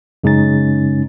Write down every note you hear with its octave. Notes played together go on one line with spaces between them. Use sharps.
F#2 C#3 G#3 C#4 D#4 A6